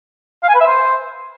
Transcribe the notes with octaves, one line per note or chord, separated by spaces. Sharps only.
F5
G#5
B4
E5
C5